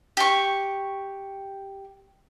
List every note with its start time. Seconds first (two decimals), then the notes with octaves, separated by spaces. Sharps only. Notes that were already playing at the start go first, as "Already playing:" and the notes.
0.17 G4 C#6